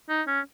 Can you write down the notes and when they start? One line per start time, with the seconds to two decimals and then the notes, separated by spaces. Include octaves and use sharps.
0.09 D#4
0.27 C#4